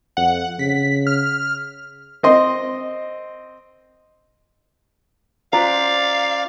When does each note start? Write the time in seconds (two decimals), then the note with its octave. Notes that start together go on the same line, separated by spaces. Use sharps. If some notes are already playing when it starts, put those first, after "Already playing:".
0.17 F2 F#5
0.59 C#3 B6
1.07 F6
2.23 C4 D#5 C6
5.53 C#4 F4 C5 D5 F5 A#5